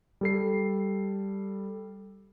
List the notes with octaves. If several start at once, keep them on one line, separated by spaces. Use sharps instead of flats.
G3 A4 C7